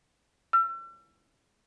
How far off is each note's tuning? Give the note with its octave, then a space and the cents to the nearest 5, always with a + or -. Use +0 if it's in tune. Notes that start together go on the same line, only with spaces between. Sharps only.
E6 +40